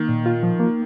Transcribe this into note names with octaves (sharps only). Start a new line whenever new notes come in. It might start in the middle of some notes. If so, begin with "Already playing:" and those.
Already playing: D#3 A#3
A#2
F4
F3
A#3